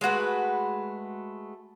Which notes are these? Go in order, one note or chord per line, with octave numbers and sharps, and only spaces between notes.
G#3 A3 F#4 B4